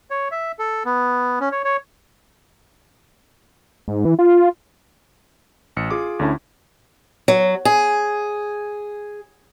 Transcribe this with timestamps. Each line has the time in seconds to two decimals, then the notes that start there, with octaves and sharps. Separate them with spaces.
0.11 C#5
0.31 E5
0.59 A4
0.85 B3
1.40 C#4
1.52 C#5
1.65 C#5
3.88 G#2
4.05 E3
4.19 F4
5.76 A1 C#7
5.90 F4 G#4 D6
6.19 D2 D3 C#4 E4 A5
7.28 F#3
7.65 G#4